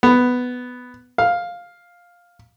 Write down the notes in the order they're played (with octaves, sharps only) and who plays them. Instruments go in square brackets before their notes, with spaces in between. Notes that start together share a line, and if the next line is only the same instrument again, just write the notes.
[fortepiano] B3
F5